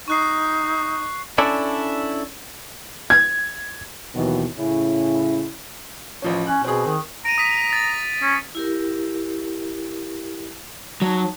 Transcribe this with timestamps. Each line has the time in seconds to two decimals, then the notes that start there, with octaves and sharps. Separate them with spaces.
0.08 D#4 C#6 F#6 C7
1.38 C#4 D4 E4 A4 D5
3.10 G#6
4.15 D#2 B2 D#3 E3 F#3
4.58 A2 C#3 C#4 E4
6.22 A1 F3 C#4
6.47 C#4 F#6
6.64 B2 C4 G#4
6.86 D#3
7.25 A#5 D7 D#7
7.38 D#6 B6
7.73 A6
8.22 C#4
8.55 E4 G4 A#4
11.02 F#3 D#4 A5